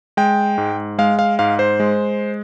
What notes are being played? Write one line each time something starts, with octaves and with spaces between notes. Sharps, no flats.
G#3 G5
G#2
G#3 F5
F5
G#2 F5
C5
G#3